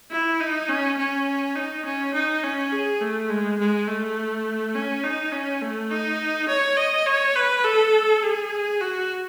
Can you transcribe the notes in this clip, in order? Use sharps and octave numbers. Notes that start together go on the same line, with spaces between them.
E4
D#4
C#4
C#4
D#4
C#4
D#4
C#4
G#4
A3
G#3
G#3
A3
C#4
D#4
C#4
A3
D#4
C#5
D#5
C#5
B4
A4
G#4
F#4